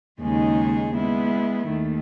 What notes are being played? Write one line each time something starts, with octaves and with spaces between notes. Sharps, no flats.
D#2 C#3 G#3 D#4 G#4
G#3 B3 E4
D#2 D#3 A3